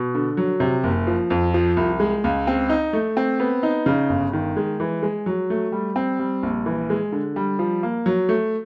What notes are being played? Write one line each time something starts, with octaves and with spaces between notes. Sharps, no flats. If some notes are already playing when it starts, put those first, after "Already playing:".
Already playing: B2
D3
F#3
C3
F#1
F3
F2
F3
C2
G#3
C#2
C4
D#4
A3
C4
B3
D#4
C#3
G1
D#3
G#3
E3
G#3
F#3
A3
G3
C4
G3
A#1
E3
G#3
D3
G3
F3
A#3
F#3
A3